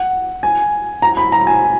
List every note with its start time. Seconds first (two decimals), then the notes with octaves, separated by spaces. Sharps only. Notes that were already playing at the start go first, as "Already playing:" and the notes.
Already playing: F#5
0.43 G#5
1.02 A#5
1.17 B5
1.32 A#5
1.47 G#5